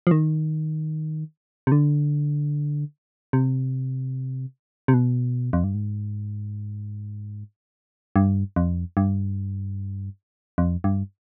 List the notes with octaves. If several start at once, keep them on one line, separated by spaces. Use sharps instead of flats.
F3
D#3
C3
D3
C3
C3
B2
F2
G2
G#2
G2
F2
G2
F2
G2